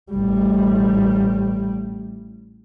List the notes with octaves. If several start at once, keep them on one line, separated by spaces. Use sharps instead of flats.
A1 G3